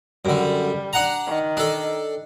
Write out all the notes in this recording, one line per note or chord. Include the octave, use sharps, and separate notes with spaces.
F#2 D3 G3
D4 F#5 A#5
D#3
D4 A4